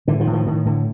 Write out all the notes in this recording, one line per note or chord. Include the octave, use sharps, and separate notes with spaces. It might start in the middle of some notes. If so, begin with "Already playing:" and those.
A2 D3 E3
D#3 F3
A2
D#3 F3
A2 D#3
A2 D3